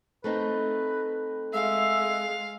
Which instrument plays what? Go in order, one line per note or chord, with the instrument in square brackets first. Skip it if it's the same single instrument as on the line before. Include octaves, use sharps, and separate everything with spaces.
[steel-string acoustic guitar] A3 C4 D#4 [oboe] B4
[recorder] G#3 [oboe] E5 [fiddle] F5